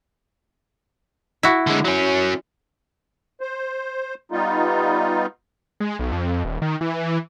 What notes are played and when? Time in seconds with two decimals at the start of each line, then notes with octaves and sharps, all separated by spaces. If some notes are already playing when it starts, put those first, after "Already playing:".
1.43 E4 F#4
1.67 D3 G#3
1.85 F#3 C#4
3.41 C5
4.32 G3 B3 D#4 F4
5.80 G#3
5.99 B1
6.12 F2
6.45 D#1
6.62 D#3
6.81 E3